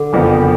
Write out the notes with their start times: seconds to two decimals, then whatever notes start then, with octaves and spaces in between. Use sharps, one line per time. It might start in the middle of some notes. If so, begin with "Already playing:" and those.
Already playing: D3
0.13 F#1 F2 F3 B3